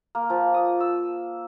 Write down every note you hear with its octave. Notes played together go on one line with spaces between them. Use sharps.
A#3
F3
D#6
E6